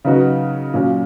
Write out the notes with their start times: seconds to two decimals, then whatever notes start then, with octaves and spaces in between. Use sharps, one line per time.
0.05 C#3 F#3 B3 D#4 F#4
0.74 A#2 F#3 C#4